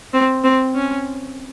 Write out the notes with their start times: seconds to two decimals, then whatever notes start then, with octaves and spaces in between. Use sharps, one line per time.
0.14 C4
0.44 C4
0.75 C#4